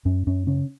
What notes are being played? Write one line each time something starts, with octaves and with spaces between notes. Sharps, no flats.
F#2 C#4
F#2 C#4
C#3 C#4